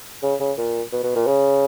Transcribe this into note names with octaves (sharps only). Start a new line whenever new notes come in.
C#3
C#3
A#2
B2
B2
A#2
C#3